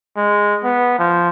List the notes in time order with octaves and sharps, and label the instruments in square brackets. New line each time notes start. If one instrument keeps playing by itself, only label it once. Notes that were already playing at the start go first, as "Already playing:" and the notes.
[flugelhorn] G#3
B3
F3